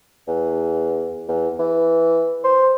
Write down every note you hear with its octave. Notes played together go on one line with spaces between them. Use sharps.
E2
E2
E3
C5